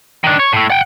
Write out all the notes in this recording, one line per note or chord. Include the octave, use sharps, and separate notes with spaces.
D#3 D4
C#5
A2 A3
F#5 G5